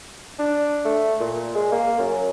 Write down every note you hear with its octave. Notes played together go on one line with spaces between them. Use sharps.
D4
A3
A#2
G#3
A#3
F#2